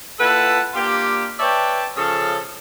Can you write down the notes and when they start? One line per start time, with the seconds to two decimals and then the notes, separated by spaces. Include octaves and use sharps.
0.19 A#2 E4 A4 B4 F#5 A5
0.74 A#3 D4 F4 G4
1.39 B4 C#5 D5 E5 G5 A5
1.96 C#3 F3 C#4 G#4 A4